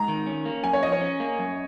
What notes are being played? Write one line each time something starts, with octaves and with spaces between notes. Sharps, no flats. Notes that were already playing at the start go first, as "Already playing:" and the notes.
Already playing: G#2 A#5
D#3
C#4
A#3
F#2 G#5
C#5
F3 D#5
C#5
C#4
A#3
F#2